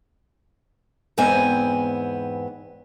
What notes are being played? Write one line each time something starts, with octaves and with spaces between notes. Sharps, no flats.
E2 G#2 B3 C4 G#5